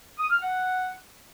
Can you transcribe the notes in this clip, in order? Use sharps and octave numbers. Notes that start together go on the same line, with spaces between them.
D#6
F6
F#5